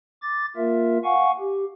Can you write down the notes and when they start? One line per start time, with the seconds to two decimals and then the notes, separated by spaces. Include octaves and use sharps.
0.22 D6 A6
0.57 A#3 F4 A#4 E5
1.04 F5 F#5 G#5 C#6
1.40 G4